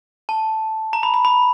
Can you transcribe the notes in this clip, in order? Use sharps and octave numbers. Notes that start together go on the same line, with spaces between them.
A5
A#5
B5
B5
B5